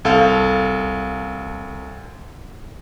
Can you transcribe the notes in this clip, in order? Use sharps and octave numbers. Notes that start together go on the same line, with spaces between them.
C2 A4 F5